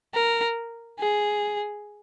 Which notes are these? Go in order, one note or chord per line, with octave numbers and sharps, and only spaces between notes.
A#4
G#4